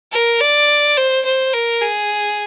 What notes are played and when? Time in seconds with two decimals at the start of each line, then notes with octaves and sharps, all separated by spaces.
0.12 A#4
0.41 D5
0.97 C5
1.25 C5
1.54 A#4
1.81 G#4